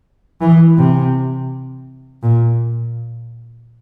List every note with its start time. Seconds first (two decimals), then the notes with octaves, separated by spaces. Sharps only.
0.41 E3
0.78 C3
2.23 A#2